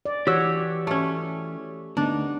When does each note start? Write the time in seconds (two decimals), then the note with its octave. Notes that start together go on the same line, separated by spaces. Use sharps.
0.05 D5
0.27 E3 F#4 G4 C#5 E6
0.87 A3 C#4
1.97 D2 A#3 B3 D4 D#4